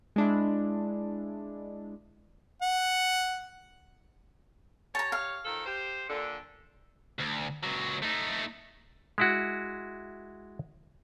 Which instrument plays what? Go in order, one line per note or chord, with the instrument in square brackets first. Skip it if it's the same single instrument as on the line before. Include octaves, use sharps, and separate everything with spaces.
[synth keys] G#3 D4 E4
[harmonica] F#5
[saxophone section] G4 C#5 [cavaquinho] A5 A#5
[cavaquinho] F5
[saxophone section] D#3 F3 A4
G4 C5
A#2 D3
[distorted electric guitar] D2
C#2 F#3
A3 D#4
[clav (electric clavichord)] G#3 E4 F#4